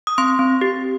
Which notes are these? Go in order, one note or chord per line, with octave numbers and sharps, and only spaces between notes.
D#6
C4 C6
C4
G4